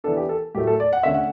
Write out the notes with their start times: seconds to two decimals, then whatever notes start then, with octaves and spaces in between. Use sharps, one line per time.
0.04 E3 B3 D4 A4
0.17 G4
0.29 A4
0.55 A2 F#3 A3 G4
0.67 A4
0.80 D5
0.93 F#5
1.03 D3 A3 C#4 E5
1.14 F#5